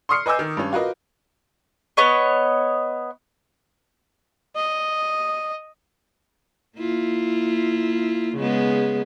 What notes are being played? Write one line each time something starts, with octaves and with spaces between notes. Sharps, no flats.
C6 C#6 D#6 F6 C7 C#7
B4 D#5 G#5 D6 E6 G6
D#3
G2 C#4
F4 F#4 A#4 B4 D#5
B3 C#5 D#5
D#5
A#3 E4 F4
C#3 G#3 B3